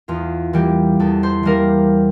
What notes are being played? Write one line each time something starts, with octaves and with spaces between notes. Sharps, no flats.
E2 F4
E3 G3 A#3 G4
E2 A4
C5
E3 G3 A#3 A#4